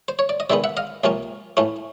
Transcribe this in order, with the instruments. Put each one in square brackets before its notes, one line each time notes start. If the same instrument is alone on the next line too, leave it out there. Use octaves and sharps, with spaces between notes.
[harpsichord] C5
C#5
D5
D#5
C3 D#3 G#3 B3 D5 E5
E5 F#5
D#5 F5
C#2 C3 F3 A#3 C#4
A2 E3 A3 C#4